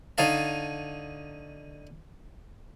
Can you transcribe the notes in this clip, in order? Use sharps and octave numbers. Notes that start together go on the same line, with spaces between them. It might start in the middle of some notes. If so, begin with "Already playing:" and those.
D3 D#4 C#5 F5 A5